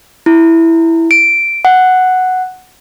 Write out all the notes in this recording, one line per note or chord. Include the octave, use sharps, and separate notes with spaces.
E4
D7
F#5